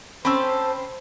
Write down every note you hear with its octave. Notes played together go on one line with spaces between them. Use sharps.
C4 C#4 A4 C5 B5 E6